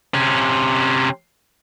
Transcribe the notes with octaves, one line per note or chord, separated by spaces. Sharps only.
C3 C#4